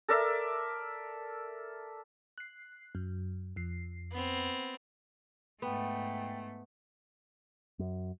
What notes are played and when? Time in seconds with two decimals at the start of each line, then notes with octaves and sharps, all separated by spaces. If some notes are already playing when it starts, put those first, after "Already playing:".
0.09 A4 A#4 D5 E5
2.38 F#6 C7
2.95 F#2
3.56 F2 C7
4.12 B3 C4
5.62 G#2 A3 B3 G5
7.79 F#2